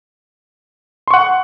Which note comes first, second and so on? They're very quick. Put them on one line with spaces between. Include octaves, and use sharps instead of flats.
C6 C#6 F#5